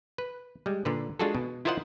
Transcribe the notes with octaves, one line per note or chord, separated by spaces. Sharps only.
B4
G3 G#3
A#2 D3 B4
G#3 D4 F4 F#4 G#4 A4
B2
E4 F4 A#4 C5 D#5 F#5